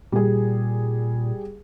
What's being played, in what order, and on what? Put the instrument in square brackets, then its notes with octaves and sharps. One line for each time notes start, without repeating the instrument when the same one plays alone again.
[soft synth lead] A#2 [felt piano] G3 G#4